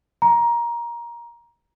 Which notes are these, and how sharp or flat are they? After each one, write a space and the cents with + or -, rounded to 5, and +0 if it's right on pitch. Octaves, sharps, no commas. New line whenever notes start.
A#5 +20